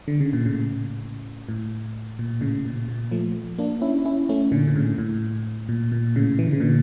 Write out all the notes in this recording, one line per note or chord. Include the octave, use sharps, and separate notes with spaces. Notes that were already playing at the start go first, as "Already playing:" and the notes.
D3
C#3
A#2
A2 C#3
A2
A#2
A2 C#3
A#2
A#2
F3 A3
A#3 D4
C#4 E4
C#4 E4
A3 C#4
A#2 D3
A#2
A2 C#3
A2
A#2
A#2
A2 C#3
E3
D3
C#3
A#2 D3